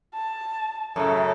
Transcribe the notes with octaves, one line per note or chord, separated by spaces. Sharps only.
A5
F#2 A2 C#3 A4